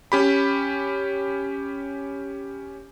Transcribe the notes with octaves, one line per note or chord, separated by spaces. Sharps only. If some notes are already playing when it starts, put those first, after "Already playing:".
C#4 G4 B5